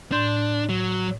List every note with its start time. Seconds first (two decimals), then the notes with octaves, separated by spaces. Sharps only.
0.12 A2 D4 C6 G6
0.69 F#3